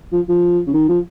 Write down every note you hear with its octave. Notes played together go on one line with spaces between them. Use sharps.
F3
F3
C#3
D#3
F3